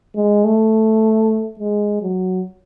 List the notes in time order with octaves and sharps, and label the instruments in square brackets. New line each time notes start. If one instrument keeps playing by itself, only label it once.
[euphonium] G#3
A3
G#3
F#3